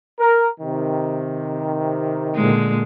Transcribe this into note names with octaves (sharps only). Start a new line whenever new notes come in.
A#4
C3 D#3
A#2 D3 G#3